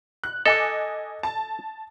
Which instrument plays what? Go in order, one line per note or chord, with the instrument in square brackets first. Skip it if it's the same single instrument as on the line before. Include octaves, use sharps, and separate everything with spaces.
[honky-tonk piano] F#6
[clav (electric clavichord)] A4 [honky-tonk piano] D#5 G#5 D6
[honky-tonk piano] A5